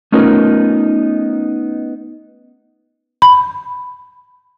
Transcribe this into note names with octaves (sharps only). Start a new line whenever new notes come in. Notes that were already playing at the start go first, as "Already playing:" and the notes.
A3 B3 C#4 D#4 F4 A#4
B5